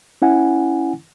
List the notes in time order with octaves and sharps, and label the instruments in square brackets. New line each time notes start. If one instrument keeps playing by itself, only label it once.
[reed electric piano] C#4 E4 F#5 G#5